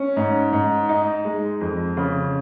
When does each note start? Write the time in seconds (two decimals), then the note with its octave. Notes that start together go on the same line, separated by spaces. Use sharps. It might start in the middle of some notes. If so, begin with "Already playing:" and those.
Already playing: C#4
0.16 G#2
0.53 G#2
0.89 D#4
1.25 G#3
1.61 F2
1.97 C#3